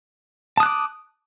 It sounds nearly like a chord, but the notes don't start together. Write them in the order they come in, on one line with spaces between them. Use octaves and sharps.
A5 D#6 F#6 D6